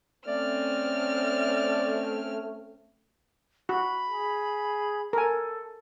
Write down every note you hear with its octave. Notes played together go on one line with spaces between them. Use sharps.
A3 C4 C#4 D5 F6
F#4 B5
G#4
A4 A#4 G#5